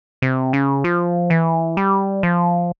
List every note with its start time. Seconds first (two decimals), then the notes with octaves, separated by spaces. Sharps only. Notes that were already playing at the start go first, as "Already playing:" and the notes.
0.22 C3
0.53 C#3
0.84 F3
1.30 E3
1.77 G3
2.23 F3